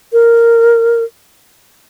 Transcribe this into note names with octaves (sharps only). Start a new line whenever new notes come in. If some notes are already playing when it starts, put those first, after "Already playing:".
A#4